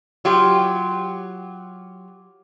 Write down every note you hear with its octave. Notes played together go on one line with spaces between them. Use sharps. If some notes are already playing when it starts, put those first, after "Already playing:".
F#3 F4 G4